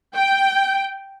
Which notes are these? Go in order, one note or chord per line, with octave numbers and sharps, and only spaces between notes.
G5